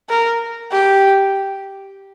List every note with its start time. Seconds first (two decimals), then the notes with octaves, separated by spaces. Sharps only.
0.09 A#4
0.72 G4